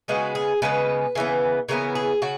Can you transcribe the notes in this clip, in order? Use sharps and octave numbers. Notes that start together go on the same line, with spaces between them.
C#3 G#3 B3 F#4
G#4
C#3 G#3 B3 B4
C#3 E3 B3
C#3 E3 B3 A#4
G#4
C#3 F#4